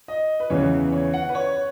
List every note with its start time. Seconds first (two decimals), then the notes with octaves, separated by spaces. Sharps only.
0.08 D#5
0.40 B4
0.50 E2 C#3 E3 C#5
0.92 C#5
1.14 F#5
1.29 B4
1.35 C#5